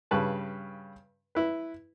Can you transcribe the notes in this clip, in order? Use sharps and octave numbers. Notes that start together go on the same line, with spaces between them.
G2 C#3 B4 A5
E4 B4